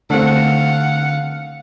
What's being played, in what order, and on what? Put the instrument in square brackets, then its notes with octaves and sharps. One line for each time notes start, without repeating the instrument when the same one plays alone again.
[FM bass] D3 [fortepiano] A3 C4 [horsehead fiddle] F5 F#5